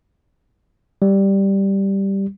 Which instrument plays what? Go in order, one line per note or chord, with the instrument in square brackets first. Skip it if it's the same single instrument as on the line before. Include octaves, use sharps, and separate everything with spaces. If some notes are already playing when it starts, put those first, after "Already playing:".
[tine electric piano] G3